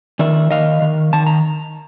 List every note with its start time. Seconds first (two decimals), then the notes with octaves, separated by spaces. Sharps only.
0.19 D#3 D5 E5
0.51 D#3 D#5 F5
0.82 D#3
1.13 D#3 A5
1.26 A#5